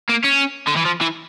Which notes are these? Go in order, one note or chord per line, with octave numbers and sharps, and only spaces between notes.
A#3
C#4
D3
E3
F3
E3